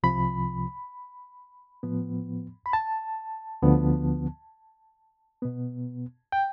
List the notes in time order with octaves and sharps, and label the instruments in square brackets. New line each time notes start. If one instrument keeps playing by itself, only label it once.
[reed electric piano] C2 C3 F3 B5
A2 F3 B3
B5
A5
D2 D3 F3 B3
B2 B3
G5